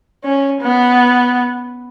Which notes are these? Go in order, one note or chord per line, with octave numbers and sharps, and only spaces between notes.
C#4
B3